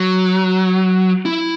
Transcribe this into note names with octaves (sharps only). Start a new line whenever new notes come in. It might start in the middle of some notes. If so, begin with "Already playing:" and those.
Already playing: F#3
E4